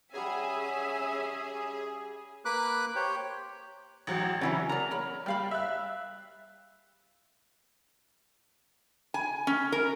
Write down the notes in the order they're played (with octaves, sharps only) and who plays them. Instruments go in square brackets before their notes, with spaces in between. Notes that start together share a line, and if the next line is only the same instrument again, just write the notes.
[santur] G3 F#5 A#5 [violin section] C#4 G#5 [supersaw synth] G#4 [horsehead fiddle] E5
[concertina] A#3 B4 B5 D6 F#6
G4 C5 C#5 G5
[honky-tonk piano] A1 F#3 F#4
[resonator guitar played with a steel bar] C#3 E3 C#4 [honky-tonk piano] F#3
[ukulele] A#4 D5 [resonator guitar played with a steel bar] A#5
[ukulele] A#4 C#5 B5
[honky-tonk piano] G3 [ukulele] A#4 F5 B5
[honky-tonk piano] E5 F#6
[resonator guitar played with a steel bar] G#5
C#4
A#4